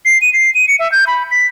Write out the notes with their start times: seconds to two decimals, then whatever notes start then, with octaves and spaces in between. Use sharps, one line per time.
0.05 C7
0.22 D#7
0.33 C7
0.55 D#7
0.68 C#7
0.79 E5
0.92 G6
1.07 B5
1.31 B6